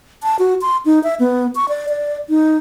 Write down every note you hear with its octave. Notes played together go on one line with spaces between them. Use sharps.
A5
F#4
C6
D#4
E5
B3
C#6
D5
D5
D#4